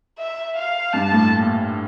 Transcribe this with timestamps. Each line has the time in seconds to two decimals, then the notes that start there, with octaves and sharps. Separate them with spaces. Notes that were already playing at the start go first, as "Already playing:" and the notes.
0.19 E5
0.56 F5
0.93 G2 A5
1.12 A2
1.30 A#2